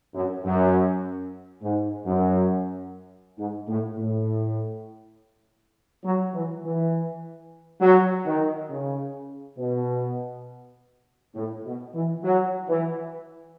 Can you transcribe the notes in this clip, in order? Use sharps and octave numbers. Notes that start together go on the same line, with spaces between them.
F#2
F#2
G#2
F#2
G#2
A2
A2
F#3
E3
E3
F#3
D#3
C#3
B2
A2
B2
E3
F#3
E3